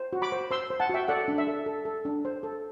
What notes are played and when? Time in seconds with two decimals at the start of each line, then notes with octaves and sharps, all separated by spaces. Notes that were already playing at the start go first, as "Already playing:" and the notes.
Already playing: C5
0.13 F#4
0.22 B5 D6
0.32 C5
0.51 C5 C6 E6
0.70 C5
0.80 F#5 A5
0.90 F#4 E5 G5
1.08 A4 D5 F#5
1.28 D4
1.38 E5
1.47 A4
1.66 A4
1.85 A4
2.05 D4
2.25 C5
2.43 A4